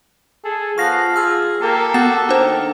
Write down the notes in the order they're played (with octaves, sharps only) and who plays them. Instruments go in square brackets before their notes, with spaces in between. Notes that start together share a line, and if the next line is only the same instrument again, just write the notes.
[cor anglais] G#4 [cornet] A4
[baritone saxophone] F3 [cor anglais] B3 [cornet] F5 [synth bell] C#6 A#6
[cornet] F4 [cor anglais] G#4 [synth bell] E6 F6
[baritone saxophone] A#3 [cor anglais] G4 [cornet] A4
[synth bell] B3 A5 A6 [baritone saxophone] F#4
[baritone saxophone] D#3 [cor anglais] A#3 [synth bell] D4 C5